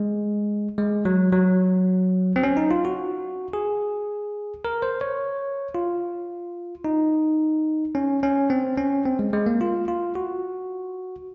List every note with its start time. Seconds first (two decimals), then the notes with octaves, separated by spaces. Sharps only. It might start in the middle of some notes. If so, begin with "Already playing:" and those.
Already playing: G#3
0.78 G#3
1.05 F#3
1.33 F#3
2.36 C4
2.43 C#4
2.57 D#4
2.71 F4
2.85 F#4
3.53 G#4
4.65 A#4
4.82 C5
5.01 C#5
5.75 F4
6.85 D#4
7.95 C#4
8.23 C#4
8.50 C4
8.78 C#4
9.05 C4
9.19 G#3
9.33 G#3
9.46 A#3
9.61 F4
9.88 F4
10.15 F#4